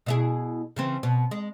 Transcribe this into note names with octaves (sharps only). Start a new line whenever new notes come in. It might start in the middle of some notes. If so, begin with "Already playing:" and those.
B2 E4 G#4
C#3 E3 C4
B2
G#3